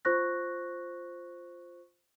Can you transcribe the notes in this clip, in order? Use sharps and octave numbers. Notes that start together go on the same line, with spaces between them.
F4 C5 C#6 F#6 A#6